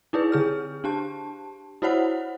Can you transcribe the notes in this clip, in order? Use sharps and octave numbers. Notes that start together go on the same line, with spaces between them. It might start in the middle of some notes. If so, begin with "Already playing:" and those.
D#4 E4 G#4 B4
D3 G#4 F6
D4 G4 A5
E4 F#4 C5 C#5 F#5